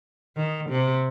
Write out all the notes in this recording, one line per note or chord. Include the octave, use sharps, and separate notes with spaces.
D#3
C3